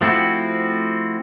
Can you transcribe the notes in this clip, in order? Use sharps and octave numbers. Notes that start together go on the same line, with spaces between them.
F3 A3 C4 E4 F#4